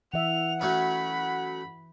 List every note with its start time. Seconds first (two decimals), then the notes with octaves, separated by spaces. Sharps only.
0.14 E3 E5 F#5 F7
0.61 F#3 A3 C#4 B5